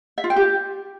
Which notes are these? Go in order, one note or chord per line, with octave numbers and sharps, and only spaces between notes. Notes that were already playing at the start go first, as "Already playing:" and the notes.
E5
F4
G5
G4